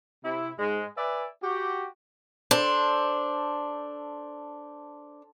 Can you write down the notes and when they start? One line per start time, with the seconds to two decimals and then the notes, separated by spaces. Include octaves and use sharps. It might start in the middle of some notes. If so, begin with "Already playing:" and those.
0.25 C3 E4
0.58 G#2 G#3
0.97 B4 D5 E5 G#5
1.43 F#4 G4
2.51 D4 A4 C5